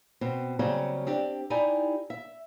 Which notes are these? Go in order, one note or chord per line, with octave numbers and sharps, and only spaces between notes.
B2 C4
C#3 F#3 G3 A#3 C4 G#4
C4 D4 G4
D#4 E4 G4 D5 G#5
E5